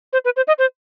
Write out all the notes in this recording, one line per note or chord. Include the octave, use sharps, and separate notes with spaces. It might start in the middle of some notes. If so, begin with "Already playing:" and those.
C5
B4
C5
D#5
C5